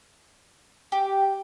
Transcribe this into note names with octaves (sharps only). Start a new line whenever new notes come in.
G4